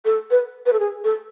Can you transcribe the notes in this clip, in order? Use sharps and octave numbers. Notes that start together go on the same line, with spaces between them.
A4
B4
B4
A4
G#4
A4